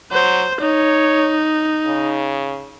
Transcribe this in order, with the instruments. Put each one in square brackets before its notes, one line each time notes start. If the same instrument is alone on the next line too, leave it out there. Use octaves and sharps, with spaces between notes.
[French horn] F#3 [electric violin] C5
[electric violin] D#4 [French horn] C#5
[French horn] C#3